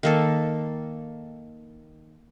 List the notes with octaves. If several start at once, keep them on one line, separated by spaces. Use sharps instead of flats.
D#3 A#3 A4